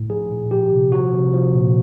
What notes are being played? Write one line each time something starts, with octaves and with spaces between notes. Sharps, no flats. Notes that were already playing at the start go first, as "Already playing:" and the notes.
Already playing: A2
F3 G#4
A#2
F3 G4
C3
F3 F#4
C3
F3
A#2